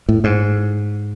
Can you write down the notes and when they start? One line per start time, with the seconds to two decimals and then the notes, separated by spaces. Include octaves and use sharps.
0.09 A2
0.24 G#2